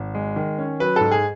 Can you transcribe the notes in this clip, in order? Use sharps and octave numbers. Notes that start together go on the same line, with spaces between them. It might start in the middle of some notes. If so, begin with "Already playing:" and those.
Already playing: G#1
G#3
D#3
C#4
F#3 B4
G#2 A4
G#4